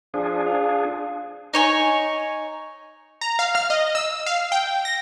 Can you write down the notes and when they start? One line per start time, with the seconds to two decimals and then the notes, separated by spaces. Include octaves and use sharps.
0.14 F3 D4 G#4
0.46 F4
1.54 D#4 C#5 G#5
3.21 A#5
3.39 F5
3.55 F6
3.70 D#5
3.95 E6
4.26 F5
4.52 G5
4.85 A#6